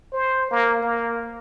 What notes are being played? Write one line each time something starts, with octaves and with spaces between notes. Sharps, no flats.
C5
A#3
A#3